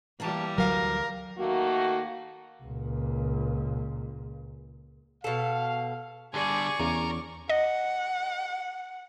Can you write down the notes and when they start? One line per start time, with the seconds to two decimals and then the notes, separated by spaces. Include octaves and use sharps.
0.20 E3 G3 A#3 F5 A5
0.58 D2 F#3 A#4 F5
1.38 D#3 A3 A#3 F#4
2.64 C#2 A#2
5.24 B2 A4 F5
6.34 D3 G3 G#4 D5 C#6
6.79 E2 C#3 A#4
7.49 D#5 F#5